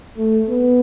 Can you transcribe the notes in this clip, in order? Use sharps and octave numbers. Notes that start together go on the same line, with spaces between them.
A3
B3